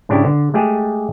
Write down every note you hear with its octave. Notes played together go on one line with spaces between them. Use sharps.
G#2 C#3 D4 E4 G4
D3
G#3 A3 G4 G#4